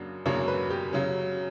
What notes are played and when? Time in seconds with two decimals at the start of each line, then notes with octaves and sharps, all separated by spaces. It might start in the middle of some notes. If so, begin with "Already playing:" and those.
Already playing: F#2 C#3 F#3 A#3 D4
0.26 F#2 C#3 F#3 A#3 D4 C#5
0.48 B4
0.70 G4
0.93 C#3 F#3 C#4